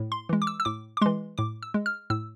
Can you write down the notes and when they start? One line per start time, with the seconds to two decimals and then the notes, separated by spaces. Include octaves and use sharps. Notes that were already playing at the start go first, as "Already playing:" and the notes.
Already playing: A2
0.12 C6
0.29 E3 G#3
0.42 D6
0.47 E6
0.60 E6
0.65 A2 D6
0.97 D6
1.02 E3 G#3 C6
1.38 A2 D6
1.63 E6
1.74 G#3
1.86 F6
2.10 A2 E6